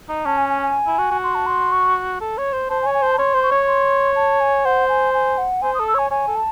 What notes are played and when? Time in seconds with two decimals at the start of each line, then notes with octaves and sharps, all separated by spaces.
0.09 D#4
0.25 C#4 A5
0.38 G#5
0.49 G#5
0.62 G#5
0.86 E4
0.98 F#4
1.11 F#4
1.23 C6
1.35 A5
1.46 C6
1.72 C#6
2.21 A4
2.37 C#5
2.53 C5
2.70 C5 A5
2.82 G#5
2.86 C#5
2.94 G#5
3.02 C5 A5
3.13 A5
3.18 C#5 C6
3.34 C5
3.43 C#6
3.51 C#5
3.67 C6
4.16 A5
4.40 G#5
4.65 C5 F#5
4.89 G#5
5.14 G#5
5.38 F#5
5.62 C5 G#5
5.74 A4 D#6
5.87 E6
5.94 C#5 G#5
6.11 C#5 G#5
6.28 A4
6.36 A5